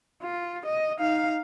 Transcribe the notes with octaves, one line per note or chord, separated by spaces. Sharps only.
F4
D#5
D#4 F5